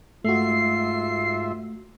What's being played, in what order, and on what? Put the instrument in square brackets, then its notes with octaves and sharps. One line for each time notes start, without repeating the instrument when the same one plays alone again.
[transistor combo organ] G#2 E5 [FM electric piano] A3 F#4 [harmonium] F4 [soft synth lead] C7